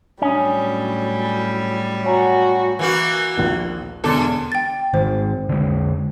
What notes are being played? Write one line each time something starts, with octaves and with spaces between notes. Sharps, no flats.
A2 F#3 G3 C#4 D4 D5 D#6
F#4 C#5 G#5 A#5
E3 A#3 F#4
A#1 D#2 G7
E1 F#2 D3 A4 D6
G5 A6
G#2 D#3 C5
D3 G#3